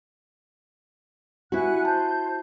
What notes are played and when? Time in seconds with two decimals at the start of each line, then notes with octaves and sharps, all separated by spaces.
1.52 E4 F#4 F#5 G#5 F#6
1.85 C5 A5 G6